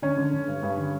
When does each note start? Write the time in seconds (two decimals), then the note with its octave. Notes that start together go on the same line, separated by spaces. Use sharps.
0.02 D3 C#4
0.17 D3
0.33 D3
0.48 G2
0.63 G2
0.77 D3